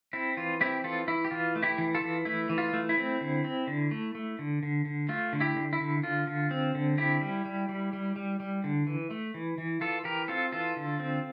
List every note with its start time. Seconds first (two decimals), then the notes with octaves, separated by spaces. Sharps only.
0.13 C4 E4
0.37 E3 F4
0.61 C4 E4 G4
0.84 E3 F4 A4
1.08 E3 E4
1.25 G4
1.31 E3 F4
1.55 A3
1.63 E4 G4
1.78 E3
1.95 F4 A4
2.02 E3
2.25 A3 E4
2.49 E3
2.58 F4
2.73 A3
2.89 E4
2.97 C4
3.21 D3
3.44 C4
3.67 D3
3.91 A3
4.15 A3
4.39 D3
4.63 D3
4.85 D3
5.09 A3 F4
5.33 D3
5.40 E4 G4
5.56 D3
5.73 E4
5.81 D3
6.03 D3 F4
6.27 D3
6.51 C4
6.75 D3
6.98 C4 E4 G4
7.21 G3
7.45 G3
7.69 G3
7.93 G3
8.16 G3
8.40 G3
8.64 D3
8.87 E3
9.11 A3
9.34 E3
9.58 E3
9.81 E3 F4 A4
10.04 E3 G4 A#4
10.28 C4 F4 A4
10.52 E3 F4 A4
10.76 D3
11.00 C4